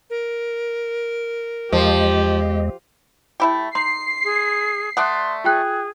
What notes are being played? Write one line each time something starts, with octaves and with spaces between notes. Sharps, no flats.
A#4
E2 F3 G#3 G4 D#5
A3 E4 G4
D#4 C6 C7
G#4
A3 D5 F#5 C6 D#6 F#6
F4 G#4 G5 F#6